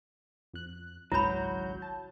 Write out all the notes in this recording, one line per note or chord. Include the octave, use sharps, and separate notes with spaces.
F2 F#6
G#1 C#2 F#3 E4 B5 G6
A5